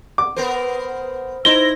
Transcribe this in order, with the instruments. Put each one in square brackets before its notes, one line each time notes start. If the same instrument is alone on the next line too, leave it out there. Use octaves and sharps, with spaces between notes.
[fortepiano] D6
[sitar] B3 A#4 C5
[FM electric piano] D#4 C5 A#6 [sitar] E4 [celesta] G7